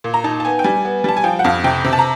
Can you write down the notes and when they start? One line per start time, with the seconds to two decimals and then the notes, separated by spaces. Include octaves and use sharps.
0.04 A#2
0.14 A#5
0.24 D#4 A5
0.40 A5
0.45 B3 G#5
0.59 G5
0.64 G3 G#5
0.85 B3
1.04 G3 A5
1.17 G#5
1.24 F3 G5
1.39 F#5
1.44 F2 F5
1.64 C3 G5
1.84 C3
1.93 A5
1.99 A#5